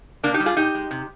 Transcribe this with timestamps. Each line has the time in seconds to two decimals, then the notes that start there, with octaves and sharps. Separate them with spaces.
0.23 C3 A#3 D4
0.34 D#4 G4
0.40 G3
0.46 F4 G#4
0.57 A#2 D#4 G4
0.75 G#3
0.91 C3